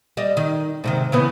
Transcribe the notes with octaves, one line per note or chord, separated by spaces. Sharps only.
G3 D#5
D#3
G#2 C3 D#3
C#3 E3 B3